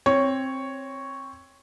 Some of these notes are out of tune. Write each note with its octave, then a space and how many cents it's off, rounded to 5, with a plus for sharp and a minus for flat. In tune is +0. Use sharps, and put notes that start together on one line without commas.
C4 +15 C#5 +0